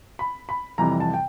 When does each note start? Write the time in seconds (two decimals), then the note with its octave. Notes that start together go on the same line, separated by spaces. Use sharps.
0.19 B5
0.49 B5
0.78 F2 C3 E3 G3 A#5
1.00 A5
1.14 G5